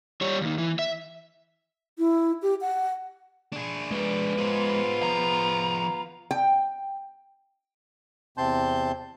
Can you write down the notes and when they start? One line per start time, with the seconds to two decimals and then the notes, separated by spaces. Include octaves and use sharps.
0.21 G3 C#5
0.41 D#2 D#3
0.58 E3
0.79 E5
1.99 E4
2.42 G4
2.61 F#5
3.53 D4 G#4
3.91 G#3 B4 D5
4.38 B3 F4 G#4 C5
5.03 F3 G#4 A#5
6.31 G5
8.38 E2 C3 C4 A5 C6 G6